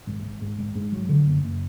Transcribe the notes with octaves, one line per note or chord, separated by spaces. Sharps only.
G#1
G#1
G#2
G#1
G#2
F#3
D3
F#1
F#1